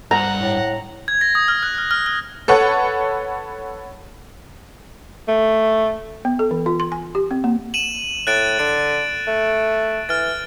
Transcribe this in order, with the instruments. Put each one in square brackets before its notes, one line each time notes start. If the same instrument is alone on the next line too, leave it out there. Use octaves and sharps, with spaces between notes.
[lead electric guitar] G2 [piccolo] F#5 [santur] A#5
[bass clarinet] A2
[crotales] G#6
A#6
D#6
F6
F#6
F6
F6
F6
[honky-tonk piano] A4 B4 C#5 F#5
[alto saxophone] A3
[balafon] B3
A4
E3
F4
C6
G#5
G4
C4
A#3
[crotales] D#7 E7 F#7
[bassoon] A2 [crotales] F#6 A6 D7
[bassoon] D3 [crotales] D7
[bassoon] A3
[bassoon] E3 [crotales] F6 A6